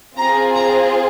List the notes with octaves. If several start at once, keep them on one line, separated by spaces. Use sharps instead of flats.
C4 F4 G#4 A#5
A#5